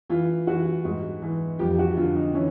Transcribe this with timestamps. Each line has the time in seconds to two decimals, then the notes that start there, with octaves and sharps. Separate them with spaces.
0.10 E3 F4
0.47 E3 F#4
0.85 G#2 F#4
1.22 E3
1.59 F2 G4
1.79 F#4
1.97 D3 F4
2.16 D#4
2.34 E3 C#4